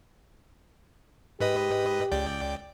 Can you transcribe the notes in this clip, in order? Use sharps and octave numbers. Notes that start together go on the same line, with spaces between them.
G#2 G4 B4 D#5
C#2 D5 G5